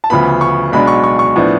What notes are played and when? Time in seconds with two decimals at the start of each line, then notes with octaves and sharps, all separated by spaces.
0.04 A5
0.10 D2 C#3 F3 B3 B5
0.41 C#6
0.72 B1 B2 G#3 D4 B5
0.87 C#6
1.04 C#6
1.19 C#6
1.36 A2 F3 B3 D4